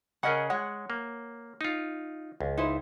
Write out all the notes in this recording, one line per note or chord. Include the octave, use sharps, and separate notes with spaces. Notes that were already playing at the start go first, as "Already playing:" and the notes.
C#3 C#4 G#4 A#4 D#5 F#5
G#3 C#5 F#5
A#3
D#4 F4
C#2
D#4 E4 C5